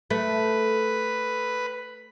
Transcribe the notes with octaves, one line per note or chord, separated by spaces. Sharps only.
A3 B4